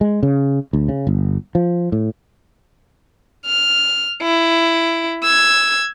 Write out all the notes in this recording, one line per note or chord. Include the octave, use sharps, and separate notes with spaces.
G#3
C#3
D2
C#3
G1
F3
A2
F6
E4
E6 G#6